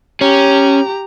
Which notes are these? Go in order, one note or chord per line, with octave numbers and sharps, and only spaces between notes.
C#4 G4 A#5